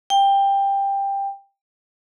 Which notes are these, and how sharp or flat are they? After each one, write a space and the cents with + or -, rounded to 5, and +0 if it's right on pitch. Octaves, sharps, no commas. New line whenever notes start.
G5 +15